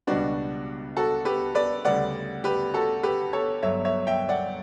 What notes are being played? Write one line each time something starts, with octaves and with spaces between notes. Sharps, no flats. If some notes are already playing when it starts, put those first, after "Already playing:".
C#2 B2 G3 B3 D4 F#4
F#4 A4
G4 B4
B4 D5
D2 C#3 G3 B3 D5 F#5
G4 B4
F#4 A4
G4 B4
A4 C#5
G1 G2 D3 F#3 C#5 E5
C#5 E5
E5 G5
D5 F#5